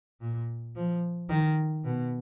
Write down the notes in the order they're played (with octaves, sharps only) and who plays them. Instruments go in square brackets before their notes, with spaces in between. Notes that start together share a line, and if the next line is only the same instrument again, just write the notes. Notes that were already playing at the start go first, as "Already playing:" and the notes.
[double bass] A#2
F3
D#3
B2